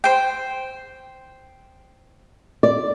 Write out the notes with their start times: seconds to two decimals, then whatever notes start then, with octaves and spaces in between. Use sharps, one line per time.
0.04 C5 G5
2.63 D5